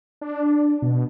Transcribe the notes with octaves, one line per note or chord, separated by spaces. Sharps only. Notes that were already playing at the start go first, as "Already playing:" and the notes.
D4
B2